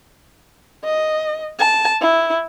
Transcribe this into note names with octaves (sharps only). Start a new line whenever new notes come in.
D#5
A5
E4